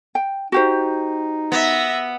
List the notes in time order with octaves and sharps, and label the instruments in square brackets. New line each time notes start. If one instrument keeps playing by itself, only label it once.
[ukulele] G5
[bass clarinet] D#4 [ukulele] F#4 G4 C5
[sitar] B3 [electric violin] E5 A#6